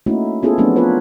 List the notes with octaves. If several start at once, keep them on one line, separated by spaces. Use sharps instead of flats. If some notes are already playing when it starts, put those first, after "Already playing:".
A3 A#3 C#4 D#4 E4 F#4
B3 C#4 E4 F4 G#4 A4
F3 F#3 A3 B3 C4 D4
B3 F4 A#4 B4 C#5